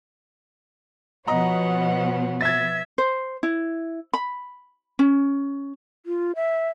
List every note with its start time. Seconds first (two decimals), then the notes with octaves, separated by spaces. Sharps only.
1.27 B2 F3 B3 C#5 D#5 F#5 A#5
2.41 E5 G#6 A6
2.98 C5
3.43 E4
4.14 B5
4.99 C#4
6.06 F4
6.36 E5